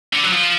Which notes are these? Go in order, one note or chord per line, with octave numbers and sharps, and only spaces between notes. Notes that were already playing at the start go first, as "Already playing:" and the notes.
D3
F#3
F3